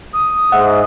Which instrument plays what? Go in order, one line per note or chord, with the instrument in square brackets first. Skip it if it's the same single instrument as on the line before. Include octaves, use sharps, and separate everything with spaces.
[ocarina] D#6
[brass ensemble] G#2 [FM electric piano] E5 F#5